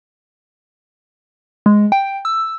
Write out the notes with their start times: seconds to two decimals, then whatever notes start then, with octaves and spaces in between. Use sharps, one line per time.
1.66 G#3
1.92 G5
2.25 E6